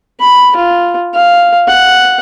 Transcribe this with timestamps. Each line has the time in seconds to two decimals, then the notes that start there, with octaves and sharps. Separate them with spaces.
0.20 B5
0.56 F4
1.14 F5
1.67 F#5